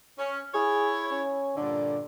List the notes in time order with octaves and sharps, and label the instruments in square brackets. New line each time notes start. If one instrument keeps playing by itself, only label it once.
[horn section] C#4
[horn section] E4 C#5 [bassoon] G#4
[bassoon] C#4
[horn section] G2 A#2 D3 [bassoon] D4